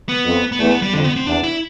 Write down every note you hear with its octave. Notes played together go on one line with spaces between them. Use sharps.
B3
F2
B3
E2 A3
B3
G3
F2 D3
B3
C4
E2 D4
E4